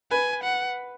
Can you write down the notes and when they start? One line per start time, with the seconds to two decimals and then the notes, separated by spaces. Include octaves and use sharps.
0.11 B4 G#5
0.43 F#5